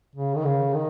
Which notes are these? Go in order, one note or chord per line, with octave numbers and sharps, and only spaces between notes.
C#3
D#3
C#3
D#3